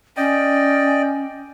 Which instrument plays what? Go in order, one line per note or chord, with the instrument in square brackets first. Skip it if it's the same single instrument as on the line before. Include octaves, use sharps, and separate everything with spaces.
[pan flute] C#4 [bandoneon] D5 D#5 G5